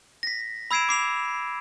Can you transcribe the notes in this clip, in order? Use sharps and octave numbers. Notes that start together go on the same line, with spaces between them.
A#6 B6
B5 E6 G#6 C7 D7 E7
D6 C7 F7